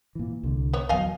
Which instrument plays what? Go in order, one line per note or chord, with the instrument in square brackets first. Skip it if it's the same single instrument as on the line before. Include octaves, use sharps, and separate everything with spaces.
[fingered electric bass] A#2 E3
C2 D3
[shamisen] B3 C#5
[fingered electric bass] D1 E2 F#3 [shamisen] D#5 F5 G#5